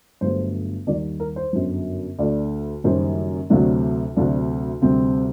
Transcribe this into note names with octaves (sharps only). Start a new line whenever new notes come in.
G1 G2 F#3 A3 C5
D#2 D#3 G3 D5
A#4
C5
G1 F#2 D3 F#3
D2 D3 A3 D5
F#1 F#2 D#3 G3 C5
D2 C3 F#3 A3 D4
D2 C3 F#3 A3 D4
D2 C3 G3 C4